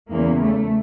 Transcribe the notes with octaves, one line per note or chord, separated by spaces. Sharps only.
E2 C#3 E3 A#3
A3